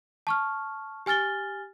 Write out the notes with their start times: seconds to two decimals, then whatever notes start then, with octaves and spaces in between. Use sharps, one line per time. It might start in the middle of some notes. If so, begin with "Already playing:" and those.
0.27 A5 C#6 F6
1.06 G4 G#5 F6 A6 G7